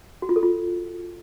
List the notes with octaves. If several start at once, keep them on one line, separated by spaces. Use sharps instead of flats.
F#4
F4
A4
F4